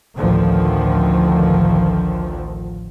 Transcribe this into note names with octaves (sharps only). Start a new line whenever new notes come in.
A1 D2 D3 D#3 F3